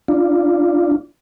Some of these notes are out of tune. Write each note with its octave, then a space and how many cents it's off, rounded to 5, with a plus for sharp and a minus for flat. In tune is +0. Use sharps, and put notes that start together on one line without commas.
D4 +0 F4 -10